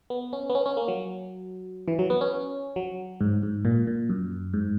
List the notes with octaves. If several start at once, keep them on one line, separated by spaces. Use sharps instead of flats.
B3
C#4
B3
C#4
C#4
A#3
F#3
E3
F#3
B3
C#4
F#3
G#2
G#2
A#2
A#2
F#2
G#2